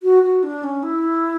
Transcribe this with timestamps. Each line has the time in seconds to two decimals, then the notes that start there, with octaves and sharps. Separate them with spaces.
0.03 F#4
0.23 F#4
0.43 D4
0.64 C#4
0.83 E4